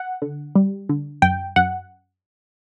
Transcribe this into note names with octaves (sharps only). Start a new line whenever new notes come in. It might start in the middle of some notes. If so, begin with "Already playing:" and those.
Already playing: F#5
D3
G3
D3
F#2 G5
F#2 F#5